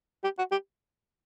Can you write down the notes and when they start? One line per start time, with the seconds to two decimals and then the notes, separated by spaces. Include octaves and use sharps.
0.24 G4
0.38 F#4
0.51 G4